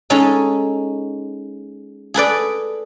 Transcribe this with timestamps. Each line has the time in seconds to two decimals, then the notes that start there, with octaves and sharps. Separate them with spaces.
0.10 G#3 C#4 D#4 A4
2.14 G#4 A4 B4 D5